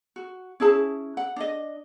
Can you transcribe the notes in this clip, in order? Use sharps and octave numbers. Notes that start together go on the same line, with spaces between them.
F#4
C#4 E4 G#4 A5
F#5
D4 D#5